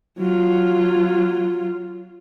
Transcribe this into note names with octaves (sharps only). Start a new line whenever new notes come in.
F#3 F4